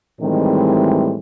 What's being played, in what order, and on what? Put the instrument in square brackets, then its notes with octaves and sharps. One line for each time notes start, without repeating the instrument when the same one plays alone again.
[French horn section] A2 D#3 E3 G3 G#3 C4